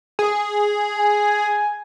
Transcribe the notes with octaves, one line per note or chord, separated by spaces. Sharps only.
G#4
G#5